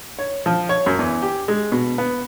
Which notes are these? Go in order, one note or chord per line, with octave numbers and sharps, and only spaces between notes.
C#5
F3
C#5
F#2
E2
G4
G#3
B2
B3